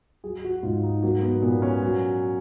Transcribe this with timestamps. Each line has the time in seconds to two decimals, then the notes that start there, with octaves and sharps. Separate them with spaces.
0.24 F#3 G#4
0.44 F#4
0.63 G#2 F4
0.83 D#4
1.02 F#3 A#3
1.22 B3
1.42 A#2 B3
1.62 C#4
1.82 F#3